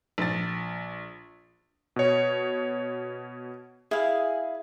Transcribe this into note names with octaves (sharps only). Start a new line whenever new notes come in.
A#1 A6
B2 C#5
E4 G#4 F5